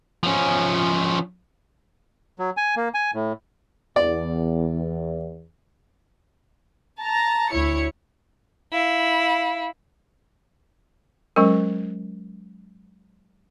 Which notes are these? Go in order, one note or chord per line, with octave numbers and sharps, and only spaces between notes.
F3 C#4
F#3
G#5
A#3
G#5
A2
E2 D5
A5 A#5
D2 E4 C#5 C#7
E4 F5
F#3 G#3 C#4 A#4